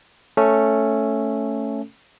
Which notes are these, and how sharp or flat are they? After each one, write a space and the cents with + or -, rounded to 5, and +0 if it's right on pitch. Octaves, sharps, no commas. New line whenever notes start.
A3 +0 C#4 +0 A4 +0